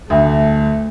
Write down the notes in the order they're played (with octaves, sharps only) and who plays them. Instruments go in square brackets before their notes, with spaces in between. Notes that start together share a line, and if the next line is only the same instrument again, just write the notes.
[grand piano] D2 [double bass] A3